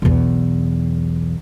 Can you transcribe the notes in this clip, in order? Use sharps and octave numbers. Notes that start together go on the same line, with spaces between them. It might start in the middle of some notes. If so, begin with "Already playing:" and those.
B1 E2